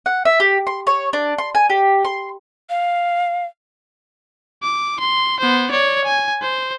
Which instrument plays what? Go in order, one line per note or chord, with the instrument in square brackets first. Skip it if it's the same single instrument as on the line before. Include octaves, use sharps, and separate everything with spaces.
[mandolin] F#5
E5
G4
C6
C#5
D4
C6
G#5
G4
C6
[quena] F5
[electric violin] D6
C6
B3 C5
C#5 D5
G#5
C5